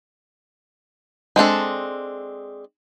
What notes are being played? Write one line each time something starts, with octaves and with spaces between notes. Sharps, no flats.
G#3 C4 D4 A4